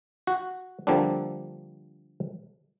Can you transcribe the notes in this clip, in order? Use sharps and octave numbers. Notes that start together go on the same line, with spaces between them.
F#4
D3 F3 G3 A#3 C4 D4